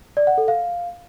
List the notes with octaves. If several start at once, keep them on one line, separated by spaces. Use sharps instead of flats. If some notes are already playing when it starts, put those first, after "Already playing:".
D5
F#5
A4
F5